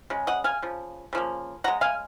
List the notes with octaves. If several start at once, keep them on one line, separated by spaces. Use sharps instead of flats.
C#3 G#3
D#5 F#5
F5 G#5
C#3 F3
C#3 F3 A#3
C#3 G#3 F#5 A#5
F5 G#5